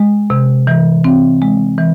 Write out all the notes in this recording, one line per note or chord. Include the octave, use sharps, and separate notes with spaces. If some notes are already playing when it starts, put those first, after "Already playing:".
Already playing: G#3
C3
E3
C4
G#3
E3